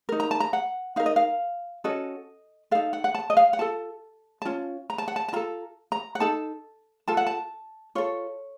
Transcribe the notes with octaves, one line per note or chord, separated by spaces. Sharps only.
D#4 A#4
A#5
A5
A#5
F#5
D#4 A#4 F5
D#5
F5
C#4 F#4 A4 D#5
D#4 A4 F5
F#5
F#5
A5
D#5
F5
F#5
F4 A4 A5
A5
C#4 F4
A#5
A5
F#5
A5
A5
F4 A4 A#5
A#5
F#5
D#4 A4 A5
F4 A4 A5
F#5
A5
F4 A4 C#5